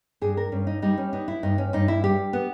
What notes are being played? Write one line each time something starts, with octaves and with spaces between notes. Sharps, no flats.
G2 G#4
A#4
G2 C#4
D#4
G3 D#4
C#4
B3 D#4
E4
G2 D#4
C#4
G2 D#4
E4
G3 G4
B3